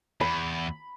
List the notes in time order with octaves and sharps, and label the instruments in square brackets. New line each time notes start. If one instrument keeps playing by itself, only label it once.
[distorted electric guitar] E2 [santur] B5